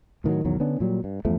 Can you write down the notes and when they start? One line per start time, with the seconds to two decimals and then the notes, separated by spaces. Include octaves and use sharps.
0.24 A2 D#3 E3 F#3
0.44 B1 E2 D#3 F#3
0.60 D3 B3 C#4 D4
0.80 A#2 F#3 G3
1.04 G2
1.25 E2 G2 F3 A3